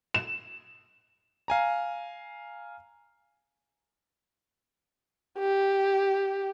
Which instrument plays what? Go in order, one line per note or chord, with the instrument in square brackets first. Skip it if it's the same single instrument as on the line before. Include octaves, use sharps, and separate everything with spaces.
[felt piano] E7
[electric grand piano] F5 G#5 A#5
[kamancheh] G4